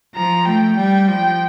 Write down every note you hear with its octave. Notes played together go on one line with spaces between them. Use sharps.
F3 A#5
A3 G5
G3 G5
F3 G5